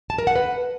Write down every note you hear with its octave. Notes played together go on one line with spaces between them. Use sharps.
A5
A#4
F#5
B4